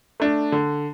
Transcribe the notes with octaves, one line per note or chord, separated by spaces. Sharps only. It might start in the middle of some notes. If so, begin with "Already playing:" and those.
A3 D4
D3